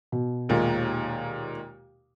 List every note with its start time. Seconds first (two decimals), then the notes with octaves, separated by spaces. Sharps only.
0.12 B2
0.49 D#2 A#2 G#3